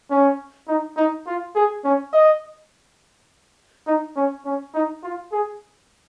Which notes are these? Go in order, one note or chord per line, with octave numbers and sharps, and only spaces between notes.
C#4
D#4
D#4
F4
G#4
C#4
D#5
D#4
C#4
C#4
D#4
F4
G#4